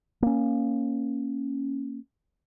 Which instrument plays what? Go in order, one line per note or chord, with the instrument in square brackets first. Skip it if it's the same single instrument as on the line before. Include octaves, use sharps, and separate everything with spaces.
[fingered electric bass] A#3 C#4